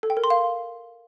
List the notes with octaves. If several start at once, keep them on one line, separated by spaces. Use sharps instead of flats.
A4
G5
A#4
C6
F5